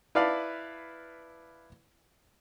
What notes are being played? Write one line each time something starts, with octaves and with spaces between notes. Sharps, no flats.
E4 B4 D5 F5 A5